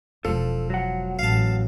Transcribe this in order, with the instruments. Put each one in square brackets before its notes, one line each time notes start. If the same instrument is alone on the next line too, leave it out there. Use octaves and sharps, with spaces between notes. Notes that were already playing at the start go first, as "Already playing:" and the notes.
[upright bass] E1 G#3 [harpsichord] F3 [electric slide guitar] A4
[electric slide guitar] F#3 F#5
[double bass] A1 [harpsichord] F5 A5